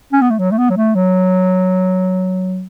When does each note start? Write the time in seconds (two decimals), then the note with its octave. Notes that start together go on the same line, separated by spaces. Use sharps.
0.12 C#4
0.21 B3
0.30 A3
0.39 F#3
0.51 A3
0.58 B3
0.70 F#3
0.76 A3
0.95 F#3